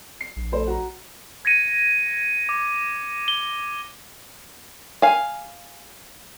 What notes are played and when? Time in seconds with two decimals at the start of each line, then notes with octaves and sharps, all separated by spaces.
0.21 C7
0.36 A#1
0.52 A3 C5
0.67 F#4 A#5
1.45 G#6 A#6 C#7 D#7
2.49 D6
3.28 G7
5.02 F5 G#5